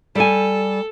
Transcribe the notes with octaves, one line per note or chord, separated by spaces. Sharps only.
G3 A4 G#5